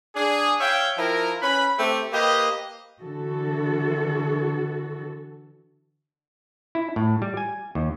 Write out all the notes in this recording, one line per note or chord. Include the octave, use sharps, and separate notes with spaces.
D4 G#4
C#5 E5 F5 G5
F3 E4 A#4
C#4 B4 B5
A3 C4 G4
A#3 G4 B4 C5 D#5
D3 E3 F#4 A4
E4
A2
G3
G#5
D#2